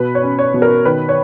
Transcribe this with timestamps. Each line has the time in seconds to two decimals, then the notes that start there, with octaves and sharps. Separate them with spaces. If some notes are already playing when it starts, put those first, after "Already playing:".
Already playing: B2 B4
0.15 C#5
0.23 C#4
0.39 C#5
0.54 B2
0.62 A#4
0.85 D#3 B4
1.09 C#5